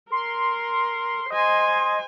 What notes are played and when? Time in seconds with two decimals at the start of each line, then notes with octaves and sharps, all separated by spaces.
0.12 A#4 C6
1.31 C5 D#5 G#5 C6